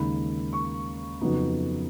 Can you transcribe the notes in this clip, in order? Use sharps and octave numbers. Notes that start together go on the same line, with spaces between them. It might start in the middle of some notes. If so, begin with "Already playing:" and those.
Already playing: D#2 C#3 G#3 D#4 B5
C#6
F2 C#3 F#3 B3 D#4